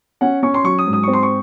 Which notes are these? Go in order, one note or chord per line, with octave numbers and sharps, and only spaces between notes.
C#4 F#5
C#4 C#6
C6
F#3 C#6
D#6
G#2
D#6
C4 C#6
C6
C#6